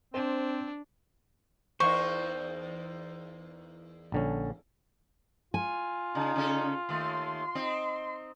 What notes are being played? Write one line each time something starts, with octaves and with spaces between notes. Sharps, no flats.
C4 D4 C5
E2 A#3 D#4 C5 C#6
A#1 D3 C#4
F4 G#5
C#3 D#4
C#3 C#4 A4
D#2 A3 C6
C4 D#4